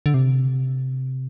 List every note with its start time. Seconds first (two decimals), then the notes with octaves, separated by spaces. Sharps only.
0.06 D3
0.14 C3